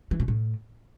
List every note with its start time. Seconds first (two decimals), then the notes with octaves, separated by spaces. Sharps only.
0.11 E3
0.20 B2
0.28 A2